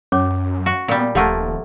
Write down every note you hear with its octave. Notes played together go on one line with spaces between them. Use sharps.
F#2 C#4 C#5 D6
F#4
A#2 G3 B3
D#1 F3 A3 A#3 G4 F#5 A5